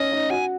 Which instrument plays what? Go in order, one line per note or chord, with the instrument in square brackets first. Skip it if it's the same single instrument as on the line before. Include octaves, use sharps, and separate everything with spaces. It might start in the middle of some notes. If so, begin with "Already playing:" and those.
Already playing: [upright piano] C#4 D#4 [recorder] D#5
[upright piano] D#4
[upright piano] F#4 [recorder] G#5